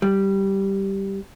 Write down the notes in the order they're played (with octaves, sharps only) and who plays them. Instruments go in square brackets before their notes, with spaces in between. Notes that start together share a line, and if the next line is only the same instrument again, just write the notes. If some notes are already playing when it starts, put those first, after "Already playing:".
[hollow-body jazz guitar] G3